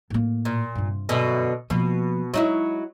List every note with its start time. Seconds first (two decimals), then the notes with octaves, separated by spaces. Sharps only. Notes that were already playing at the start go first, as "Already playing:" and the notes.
0.10 A2 A#3
0.45 A#2
0.75 G2 C3
1.09 F#2 B2 D3
1.70 B2 F3 A#3
2.34 F#3 G#3 D#4 E4